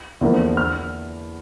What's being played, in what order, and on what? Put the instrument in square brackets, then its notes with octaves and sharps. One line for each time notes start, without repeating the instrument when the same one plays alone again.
[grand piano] E2 D3 F3 A#3
F6